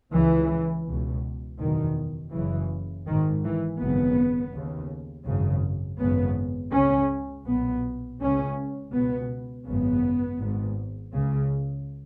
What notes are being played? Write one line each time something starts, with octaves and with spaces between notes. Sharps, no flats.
C#2 C#3 E3
C#2 B2
F#1 E2 B2 D#3
F#1 F#2 C#3 E3
G#1 G#2 D#3
E3
G#1 F#2 C#3 B3
D#2 C#3
G#1 F#2 C#3
G#1 F#2 C#3 B3
C#2 C#3 C#4
B1 A#2 B3
C#2 C#3 C#4
C#2 B2 B3
G#1 F#2 C#3 B3
G#1 G#2
C#2 C#3